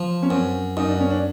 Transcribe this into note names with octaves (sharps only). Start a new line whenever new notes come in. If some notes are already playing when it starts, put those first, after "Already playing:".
Already playing: F3
C#4
F#2 C4
F#2 D#4
D4
C#4
D4